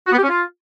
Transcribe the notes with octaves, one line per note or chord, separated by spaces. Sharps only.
F#4
B3
G4
C#4
F4